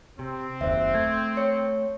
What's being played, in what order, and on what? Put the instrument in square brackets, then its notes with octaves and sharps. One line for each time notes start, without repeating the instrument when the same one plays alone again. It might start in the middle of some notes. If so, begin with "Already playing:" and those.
[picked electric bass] C3 [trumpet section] C4
[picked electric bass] F#1 D#2 [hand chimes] C5 E5
[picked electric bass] A3 [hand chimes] G#6
[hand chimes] C#5 C#7